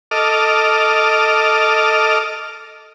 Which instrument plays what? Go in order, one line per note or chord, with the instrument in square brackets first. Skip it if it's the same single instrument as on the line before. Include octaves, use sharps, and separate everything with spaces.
[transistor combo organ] A4 D#5 D6 F6